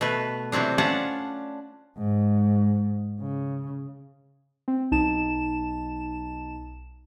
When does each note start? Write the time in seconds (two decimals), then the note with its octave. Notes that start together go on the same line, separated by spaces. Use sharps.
0.01 B2 A3 B4
0.52 C3 E3 F#3 C4 D4
0.78 C#4 D4 F4 D5 F#5 A5
1.98 G#2
3.21 C#3
4.68 C4
4.92 B1 D#4 A5 E7